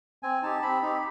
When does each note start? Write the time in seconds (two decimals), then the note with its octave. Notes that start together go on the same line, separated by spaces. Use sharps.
0.23 C4 G#5
0.42 D#4 G4 A5
0.62 C4 B5
0.82 D#4 G4